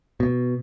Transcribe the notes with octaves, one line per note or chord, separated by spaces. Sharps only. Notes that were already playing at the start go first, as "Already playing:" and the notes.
B2